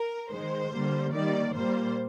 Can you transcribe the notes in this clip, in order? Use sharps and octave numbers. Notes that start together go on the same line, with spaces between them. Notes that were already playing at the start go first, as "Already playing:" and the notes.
Already playing: A#4
D#3 G#3 C5
D3 G3 A#3
D#3 G3 A#3 D5
A#2 G3 A#3 C5